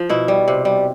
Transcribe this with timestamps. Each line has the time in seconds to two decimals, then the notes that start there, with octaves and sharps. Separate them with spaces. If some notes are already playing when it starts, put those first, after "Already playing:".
Already playing: F3
0.09 B2 E4
0.28 G3
0.48 C3
0.65 G3